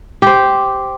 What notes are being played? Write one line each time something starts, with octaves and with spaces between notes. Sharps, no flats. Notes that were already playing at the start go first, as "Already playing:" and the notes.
G4 C5